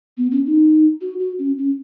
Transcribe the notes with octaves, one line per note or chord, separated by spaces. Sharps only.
B3
C#4
D#4
F#4
F#4
C#4
C#4